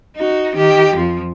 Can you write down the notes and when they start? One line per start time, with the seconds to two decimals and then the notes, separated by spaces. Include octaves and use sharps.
0.16 D#4 F#4
0.56 D#3 G4
0.96 F2 F3